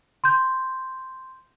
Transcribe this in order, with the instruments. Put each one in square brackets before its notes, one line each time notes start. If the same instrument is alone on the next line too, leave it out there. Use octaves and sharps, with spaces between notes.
[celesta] C6 G6